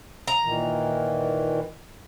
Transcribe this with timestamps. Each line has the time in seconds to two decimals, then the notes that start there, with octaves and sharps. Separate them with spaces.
0.27 A#5
0.44 A#2 D#3 E3